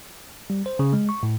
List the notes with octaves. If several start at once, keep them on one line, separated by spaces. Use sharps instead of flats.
G3
C5
C#3
G#3
C#6
A2